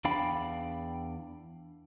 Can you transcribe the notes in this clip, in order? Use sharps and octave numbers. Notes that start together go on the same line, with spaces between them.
E2 D4 F5 G5 B5